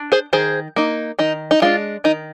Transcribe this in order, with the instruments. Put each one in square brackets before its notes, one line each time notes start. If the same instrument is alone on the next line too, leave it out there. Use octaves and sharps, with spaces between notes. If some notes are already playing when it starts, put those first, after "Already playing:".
Already playing: [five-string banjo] D4
G#4 C5
D#3 G#4 C5
A#3 D#4
D#3 D#4
D#4
G#3 D4 F4
D#3 D#4